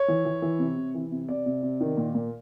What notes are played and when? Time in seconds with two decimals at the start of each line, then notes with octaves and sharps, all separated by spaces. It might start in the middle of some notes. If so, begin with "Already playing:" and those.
Already playing: C#5
0.08 E3
0.25 E3
0.42 E3
0.59 C3
0.76 C3
0.94 E3
1.12 C3
1.28 C3 D5
1.46 C3
1.63 C3
1.80 D#3
1.97 A#2
2.15 A#2